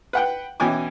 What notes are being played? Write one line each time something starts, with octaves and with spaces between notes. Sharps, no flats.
B4 F#5 G5
B2 E3 C#4 G5 G#5 D6